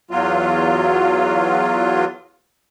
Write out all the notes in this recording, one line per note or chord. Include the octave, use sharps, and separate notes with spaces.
E2 F#3 F4